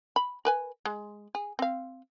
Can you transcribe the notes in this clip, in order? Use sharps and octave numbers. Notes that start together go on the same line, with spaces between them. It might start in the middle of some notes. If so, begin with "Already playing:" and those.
B5
A#4 B4 G#5
G#3
G#4
C4 F5